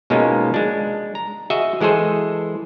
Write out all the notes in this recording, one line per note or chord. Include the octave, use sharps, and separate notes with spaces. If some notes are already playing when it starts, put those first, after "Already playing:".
B2 G#3 A#3 C#4 D#4 F4
G#3 D4
A#5
F#4 G#4 D#5 E5
E3 G#3 G#4 A4 C5